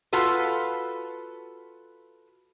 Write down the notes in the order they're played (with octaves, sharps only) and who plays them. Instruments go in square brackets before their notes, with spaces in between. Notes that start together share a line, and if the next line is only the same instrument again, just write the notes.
[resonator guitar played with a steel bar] F4 F#4 A4 B4